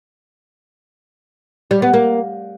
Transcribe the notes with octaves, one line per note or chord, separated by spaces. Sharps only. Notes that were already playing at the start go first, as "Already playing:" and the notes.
G3
B3
A#3